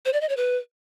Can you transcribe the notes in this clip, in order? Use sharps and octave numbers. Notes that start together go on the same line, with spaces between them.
C5
D5
D#5
C#5
B4